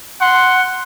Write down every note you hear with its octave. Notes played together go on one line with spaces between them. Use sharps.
F#5 C6